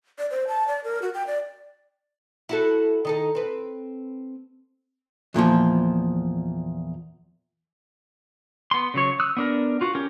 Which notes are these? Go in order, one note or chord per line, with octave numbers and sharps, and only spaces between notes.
D5
C5
A5
D5
A#4
F#4
G5
D5
E4 F#4 A4
D#3 D#4 A4
C4 B4
E2 A#2 D#3 F3
B3 C6
C#3 F#3 C#5
D#6 E6 F#6
B3 D4 A#4
F4 F#4
C#4 G4 A#4